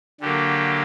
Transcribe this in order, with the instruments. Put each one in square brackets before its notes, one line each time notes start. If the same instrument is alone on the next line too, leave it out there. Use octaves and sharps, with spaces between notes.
[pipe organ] D3 F#3 A#3 G4